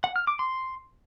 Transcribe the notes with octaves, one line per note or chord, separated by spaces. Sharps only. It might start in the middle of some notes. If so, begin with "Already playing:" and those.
F#5
F6
D6
C6